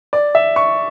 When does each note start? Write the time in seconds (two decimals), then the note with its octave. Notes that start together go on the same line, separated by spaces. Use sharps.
0.13 D5
0.35 E5
0.56 C#6